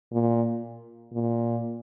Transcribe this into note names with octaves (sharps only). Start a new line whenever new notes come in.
A#2
A#2